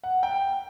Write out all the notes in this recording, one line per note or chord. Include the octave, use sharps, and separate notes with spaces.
F#5
G5